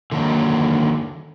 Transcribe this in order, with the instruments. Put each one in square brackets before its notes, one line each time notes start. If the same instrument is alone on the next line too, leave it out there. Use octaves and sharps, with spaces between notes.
[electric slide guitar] D3 D#3 F#3 A#3